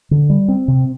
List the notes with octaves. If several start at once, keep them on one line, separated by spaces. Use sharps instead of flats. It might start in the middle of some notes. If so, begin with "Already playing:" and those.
D3
G3
C4
C3